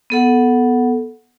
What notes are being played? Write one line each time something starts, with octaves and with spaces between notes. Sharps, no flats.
B3 A4 F#5